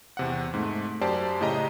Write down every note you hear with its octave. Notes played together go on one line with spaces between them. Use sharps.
E2 C3 F#5
G#2 A3
F#2 G4 C5 D5 A5
A2 C#3 G4 D#5 A#5